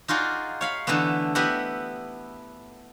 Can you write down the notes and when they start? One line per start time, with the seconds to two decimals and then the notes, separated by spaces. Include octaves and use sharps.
0.08 D#4 F4 F#4 G#4 D5
0.61 C#5 F5 B5
0.87 D3 E3 A3 B3
1.35 B3 E4 G4 B4 D#5 F#5